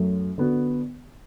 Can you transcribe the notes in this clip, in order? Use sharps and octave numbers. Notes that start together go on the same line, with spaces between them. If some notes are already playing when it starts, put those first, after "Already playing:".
Already playing: F#2 F#3 A3
D3 B3 F#4